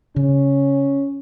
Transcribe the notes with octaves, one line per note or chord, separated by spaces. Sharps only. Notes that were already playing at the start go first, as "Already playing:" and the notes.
C#3 C#4